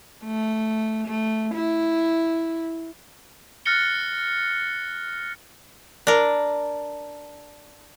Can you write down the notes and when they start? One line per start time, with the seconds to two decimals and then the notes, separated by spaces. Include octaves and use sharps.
0.24 A3
1.07 A3
1.54 E4
3.66 F6 F#6 A6 A#6 C#7 G7
6.07 D4 A#4